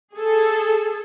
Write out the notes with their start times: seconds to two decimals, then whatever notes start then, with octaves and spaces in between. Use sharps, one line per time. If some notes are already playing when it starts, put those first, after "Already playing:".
0.15 G#4 A4